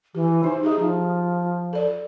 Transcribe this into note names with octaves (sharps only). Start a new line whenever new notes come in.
E3 G4
D#4 C5
D#4 G4 G#4 E5
F3
A4 D5